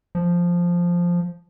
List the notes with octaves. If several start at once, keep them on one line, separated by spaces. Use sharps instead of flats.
F3